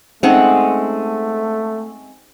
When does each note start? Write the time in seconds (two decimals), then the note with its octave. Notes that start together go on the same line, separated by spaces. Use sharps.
0.23 G#3 A3 C4 C#4 D#4 F#5